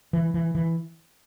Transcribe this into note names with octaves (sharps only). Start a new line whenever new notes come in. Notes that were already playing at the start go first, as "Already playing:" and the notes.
E3
E3
E3